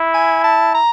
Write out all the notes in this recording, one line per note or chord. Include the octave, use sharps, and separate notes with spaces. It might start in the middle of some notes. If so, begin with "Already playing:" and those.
Already playing: E4
G#5
A5
A#5